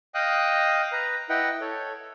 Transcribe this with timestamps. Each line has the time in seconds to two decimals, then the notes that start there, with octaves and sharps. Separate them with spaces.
0.15 D#5 F5 G5 D#6 F#6
0.92 B4 A#5
1.29 E4 B4 D#5 F#5 G5
1.61 A4 C#5